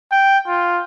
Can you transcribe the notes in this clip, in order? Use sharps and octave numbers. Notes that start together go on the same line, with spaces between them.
G5
F4